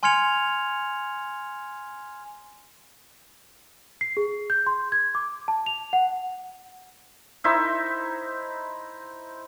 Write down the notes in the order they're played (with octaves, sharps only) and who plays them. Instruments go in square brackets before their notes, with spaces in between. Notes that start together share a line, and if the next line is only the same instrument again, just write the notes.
[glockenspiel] G#5 C6 F6 G#6 C#7 F7
[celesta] C7
G#4
G6
C6
G#6
D6
A5
F7
F#5
[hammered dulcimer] D#4 E4 C5 E5